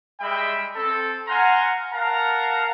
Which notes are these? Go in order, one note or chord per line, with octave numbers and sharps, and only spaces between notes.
G3 G#3 E5 G5 B5
C4 A4
F5 F#5 G#5 A#5 C6
A#4 F5 F#5 A5 A#5